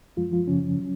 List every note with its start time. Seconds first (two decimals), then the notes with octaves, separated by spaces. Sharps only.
0.17 F#2 F3 G#3 F4
0.32 F3 F4
0.47 F#2 C#3 F3 C#4
0.79 F#3